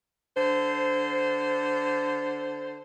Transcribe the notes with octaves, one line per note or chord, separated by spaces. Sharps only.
D3 C5